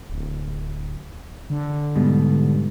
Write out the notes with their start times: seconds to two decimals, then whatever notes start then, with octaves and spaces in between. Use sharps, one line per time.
0.10 D1
1.50 D3
1.95 G#2 B2 G3